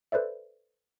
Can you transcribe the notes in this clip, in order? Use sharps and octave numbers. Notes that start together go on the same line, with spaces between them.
A4 B4 C5 D5 E5